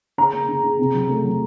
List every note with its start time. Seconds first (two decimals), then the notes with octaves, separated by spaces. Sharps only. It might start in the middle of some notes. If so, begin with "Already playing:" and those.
0.18 C#3 A#5
0.33 A#3
0.48 C#3
0.64 C#3
0.79 C3
0.94 F#3
1.09 A3
1.24 F#3